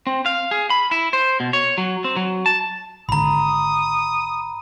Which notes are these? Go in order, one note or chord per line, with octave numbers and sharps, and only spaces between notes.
C4
F5
G#4
B5
E4
C5
B2
C#5
F#3
C4
F#3
A5
G#1 D3 A#5 B5 D#6